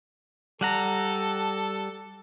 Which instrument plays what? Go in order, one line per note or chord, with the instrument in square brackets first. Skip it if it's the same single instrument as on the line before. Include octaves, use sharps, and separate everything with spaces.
[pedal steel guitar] G3 F#5 A#5 [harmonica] A4